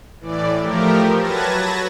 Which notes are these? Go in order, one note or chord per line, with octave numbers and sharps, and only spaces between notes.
A2 E3 D5
F3 A3 G4 A#4
F#3 B4 A5 G#6 A#6